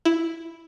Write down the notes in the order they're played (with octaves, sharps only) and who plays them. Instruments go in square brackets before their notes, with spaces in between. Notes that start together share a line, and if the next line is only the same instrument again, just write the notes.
[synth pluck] E4